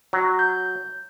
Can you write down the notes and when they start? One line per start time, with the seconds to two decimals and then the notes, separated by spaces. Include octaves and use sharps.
0.13 F#3
0.39 G6